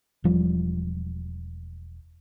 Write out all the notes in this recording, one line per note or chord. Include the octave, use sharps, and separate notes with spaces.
E1 F3 G3